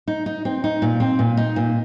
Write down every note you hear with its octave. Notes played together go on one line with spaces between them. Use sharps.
D#4
D#4
C4
D#4
A#2
C4
A#2
D#4
A#2